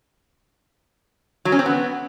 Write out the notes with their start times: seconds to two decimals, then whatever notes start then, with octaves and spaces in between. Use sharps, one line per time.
1.45 F#3
1.52 C#4
1.59 C4
1.66 B3